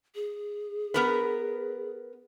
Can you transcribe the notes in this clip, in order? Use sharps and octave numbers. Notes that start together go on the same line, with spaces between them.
G#4
B3 A#4 B4